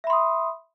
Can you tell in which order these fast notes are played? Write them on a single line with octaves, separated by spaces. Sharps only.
E5 B5 C6 D#6